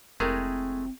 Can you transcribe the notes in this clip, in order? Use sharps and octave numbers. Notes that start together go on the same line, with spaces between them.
F1 G#3 A3 C4 E4 G4 G#4 A#4